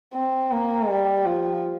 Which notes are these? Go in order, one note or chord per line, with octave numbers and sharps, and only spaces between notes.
C4
A#3
G3
F3